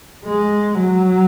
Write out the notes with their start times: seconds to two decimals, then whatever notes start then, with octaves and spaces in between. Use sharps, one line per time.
0.25 G#3
0.79 F#3